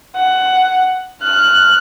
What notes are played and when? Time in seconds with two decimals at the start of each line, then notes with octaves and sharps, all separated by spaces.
0.15 F#5
1.21 F6 F#6